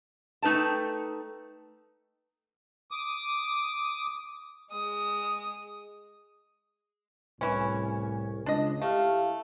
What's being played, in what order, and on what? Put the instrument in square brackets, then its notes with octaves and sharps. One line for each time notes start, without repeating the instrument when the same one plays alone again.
[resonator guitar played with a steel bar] A3 D#4 B4 G5 A5
[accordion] D6 D#6
[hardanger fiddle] G#3 D#6
[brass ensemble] C2 A2 [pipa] E3 C#4
[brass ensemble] C#2 [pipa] D4 D#5
[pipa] A3 [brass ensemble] E4 G4 F5